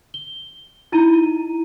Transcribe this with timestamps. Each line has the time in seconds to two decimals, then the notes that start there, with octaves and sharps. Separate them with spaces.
0.14 G7
0.92 D#4 E4 A#5 D#7